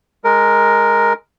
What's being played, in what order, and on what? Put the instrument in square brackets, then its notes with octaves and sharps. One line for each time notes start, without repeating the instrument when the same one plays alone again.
[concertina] G#3 A#4